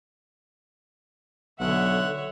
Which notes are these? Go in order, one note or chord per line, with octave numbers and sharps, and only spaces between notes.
B1 D3 C#5 E5 F#5